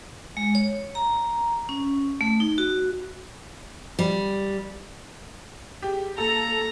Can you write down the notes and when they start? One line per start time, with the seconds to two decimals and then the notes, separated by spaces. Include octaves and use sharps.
0.37 G#3
0.55 C#5
0.95 A#5
1.69 C#4
2.21 A3
2.40 D#4
2.58 F#4
3.99 G3
5.82 G4 G#4
6.18 A#3 A4 A#5